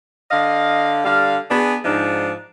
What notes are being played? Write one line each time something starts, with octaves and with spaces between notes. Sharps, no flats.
D3 D#5 F5
D3 G3 F5
B3 D4 G#4
G#2 F3 D4 D#4